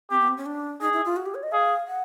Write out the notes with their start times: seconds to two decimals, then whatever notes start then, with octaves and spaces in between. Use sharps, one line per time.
0.10 C4 G4
0.20 B3
0.28 C4
0.37 C#4
0.46 D4
0.81 D#4 G#4
0.93 E4
1.05 F4
1.16 F#4
1.26 G4
1.35 C#5
1.43 D#5
1.52 G#4 F5
1.87 F#5